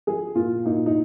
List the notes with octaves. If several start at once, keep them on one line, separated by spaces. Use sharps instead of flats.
F3 G#4
A#2 F4
A#2 D#4
D#4